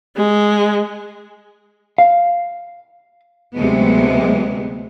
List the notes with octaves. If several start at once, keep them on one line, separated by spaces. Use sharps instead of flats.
G#3
F5
D2 C3 F#3 G#3 B3